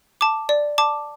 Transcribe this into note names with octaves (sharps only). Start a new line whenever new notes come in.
A5 D6
D5
A5 D6